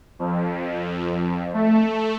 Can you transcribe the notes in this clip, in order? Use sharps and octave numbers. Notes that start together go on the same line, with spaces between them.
F2
A3